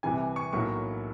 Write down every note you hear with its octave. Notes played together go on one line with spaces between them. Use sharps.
C2 C3 E3 G3 G#5
C#6
B1 A2 F#3 A#3 C#6